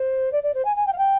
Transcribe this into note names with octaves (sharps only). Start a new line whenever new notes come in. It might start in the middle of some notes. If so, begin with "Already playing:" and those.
Already playing: C5
D5
D5
C5
G#5
G#5
G5
F5
G5